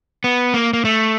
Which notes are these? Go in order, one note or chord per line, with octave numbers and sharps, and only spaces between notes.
B3
A#3
A#3
A3